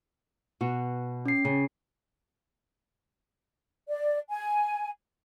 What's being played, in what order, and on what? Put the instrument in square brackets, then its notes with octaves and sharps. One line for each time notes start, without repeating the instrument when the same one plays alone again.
[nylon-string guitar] B2 F#4
[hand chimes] C#4 C7
[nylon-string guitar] C#3
[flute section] D5
G#5